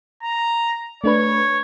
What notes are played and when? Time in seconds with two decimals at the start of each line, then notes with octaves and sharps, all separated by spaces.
0.23 A#5
1.04 A3 D4 B4 C#5